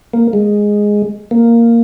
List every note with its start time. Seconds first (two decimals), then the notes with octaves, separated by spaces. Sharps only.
0.14 A#3
0.33 G#3
1.31 A#3